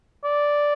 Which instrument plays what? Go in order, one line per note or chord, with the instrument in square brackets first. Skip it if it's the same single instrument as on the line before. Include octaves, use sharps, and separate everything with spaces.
[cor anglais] D5